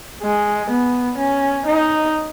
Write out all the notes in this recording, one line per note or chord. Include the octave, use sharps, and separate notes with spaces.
G#3
B3
C#4
D#4